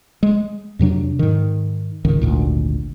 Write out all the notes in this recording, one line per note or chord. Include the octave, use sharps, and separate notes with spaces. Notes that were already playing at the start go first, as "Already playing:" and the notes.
G#3
F2 C3 F#3 D4
G#2 D#3
C#2 G#2 D#3
G#1 D2 A#2